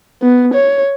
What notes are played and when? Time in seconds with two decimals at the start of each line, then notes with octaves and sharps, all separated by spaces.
0.22 B3
0.54 C#5